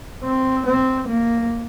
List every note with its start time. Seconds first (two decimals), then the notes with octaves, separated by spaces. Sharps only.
0.24 C4
0.66 C4
1.08 A#3